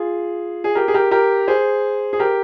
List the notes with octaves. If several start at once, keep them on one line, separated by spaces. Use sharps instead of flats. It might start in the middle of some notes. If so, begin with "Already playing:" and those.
Already playing: F4 G#4
G#4
G4 A#4
G#4
G4 A#4
G4 A#4
G#4 C5
G#4
G4 A#4